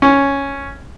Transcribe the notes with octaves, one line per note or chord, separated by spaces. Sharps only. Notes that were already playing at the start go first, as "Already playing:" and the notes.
C#4